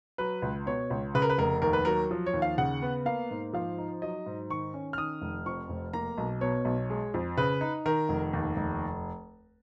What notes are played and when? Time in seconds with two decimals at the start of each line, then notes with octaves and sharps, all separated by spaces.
0.18 F#3 B4
0.42 C#2
0.66 B2 C#5
0.90 C#2
1.15 C#3 B4
1.22 A#4
1.30 B4
1.38 F1 A#4
1.62 D#2 A#4
1.73 B4
1.85 F#3 A#4
2.11 F3
2.26 C#5
2.34 D#2
2.42 F5
2.58 C#3 F#5
2.82 B3
3.06 A#3 F5
3.30 G#2
3.53 F3 F5
3.78 D#4
4.02 F#3 D#5
4.26 G#2
4.50 D#3 C#6
4.74 C#4
4.93 F6
4.98 D#3 D#6
5.22 F1
5.46 F2 C#6
5.69 F1
5.93 A#3 A#5
6.18 B1
6.41 B2 C#5
6.65 B1
6.90 G#3
7.14 F2
7.37 C#3 B4
7.61 D#4
7.86 D#3 A#4
8.09 F1
8.33 D#2
8.57 F1